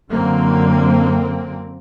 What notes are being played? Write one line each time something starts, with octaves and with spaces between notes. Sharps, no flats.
F#2 D3 A#3 C4